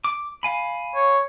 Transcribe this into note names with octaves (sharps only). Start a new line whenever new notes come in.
D6
F5 G#5 B5
C#5